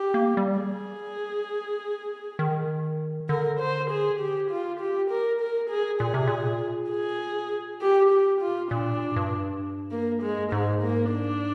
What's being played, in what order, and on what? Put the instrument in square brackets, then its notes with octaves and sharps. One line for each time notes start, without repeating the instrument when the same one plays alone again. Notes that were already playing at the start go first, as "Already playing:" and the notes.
Already playing: [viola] G4
[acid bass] A#3
G3
[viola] G#4
[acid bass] D#3
[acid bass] D3 [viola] A#4
[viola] C5
G#4
G4
F4
G4
A#4
A#4
G#4
[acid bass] A#2 [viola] G#4
[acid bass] C3
A#2
[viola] G#4
G4
G4
F4
[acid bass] A#2 [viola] D4
[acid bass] G2
[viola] A#3
G#3
[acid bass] G#2 [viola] G#3
[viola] A#3
D4